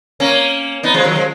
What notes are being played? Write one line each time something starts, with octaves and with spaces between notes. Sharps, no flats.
A#3 C#4
B3 D#4
F3 G#3
D#3 F#3
F3 G#3